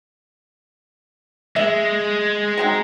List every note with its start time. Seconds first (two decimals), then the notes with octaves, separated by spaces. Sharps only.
1.56 G#3 E5
2.58 F#3 C4 D#4